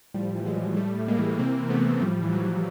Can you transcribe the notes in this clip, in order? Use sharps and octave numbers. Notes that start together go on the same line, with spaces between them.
A2 F3 G3
E3
F#3 G#3
A2
A2 G3 A3
A2
G#3 A#3
E3
C3 A#3 C4
E3
A3 B3
E3
A2 F3 G3
E3
E3 F#3
E3